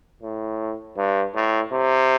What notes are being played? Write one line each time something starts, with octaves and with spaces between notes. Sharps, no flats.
A2
G2
A2
C3